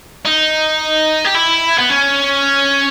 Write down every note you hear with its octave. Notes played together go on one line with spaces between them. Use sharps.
D#4
G4
E4
B3
C#4